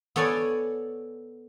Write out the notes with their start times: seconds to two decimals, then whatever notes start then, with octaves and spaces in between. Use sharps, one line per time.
0.16 B3 A4 C#5 D5 G#5